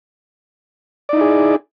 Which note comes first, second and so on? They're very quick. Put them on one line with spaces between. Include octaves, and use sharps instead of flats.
D5 D#4 E4 G#4